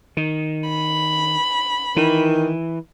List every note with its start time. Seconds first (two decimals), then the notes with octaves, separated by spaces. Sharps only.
0.17 D#3
0.69 B5
1.96 D#3 E3